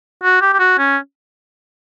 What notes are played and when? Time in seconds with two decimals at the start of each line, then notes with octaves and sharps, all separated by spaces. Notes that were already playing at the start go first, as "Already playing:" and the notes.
0.23 F#4
0.41 G4
0.53 G4
0.59 F#4
0.78 C#4